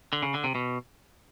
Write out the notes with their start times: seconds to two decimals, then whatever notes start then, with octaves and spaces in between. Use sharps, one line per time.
0.13 D3
0.22 C#3
0.34 D3
0.44 C3
0.55 B2